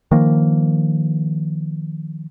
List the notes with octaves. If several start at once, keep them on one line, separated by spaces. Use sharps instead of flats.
D#3 F3 A#3